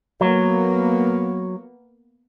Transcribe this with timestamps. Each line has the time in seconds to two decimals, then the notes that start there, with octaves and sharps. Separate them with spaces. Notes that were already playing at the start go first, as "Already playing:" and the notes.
0.21 F#3 A#3 B3